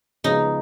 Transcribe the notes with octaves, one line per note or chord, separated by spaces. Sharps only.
C#2 C#3 F3 G#3 B3 D#4